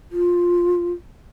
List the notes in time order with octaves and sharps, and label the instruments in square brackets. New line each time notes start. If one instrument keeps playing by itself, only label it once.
[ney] F4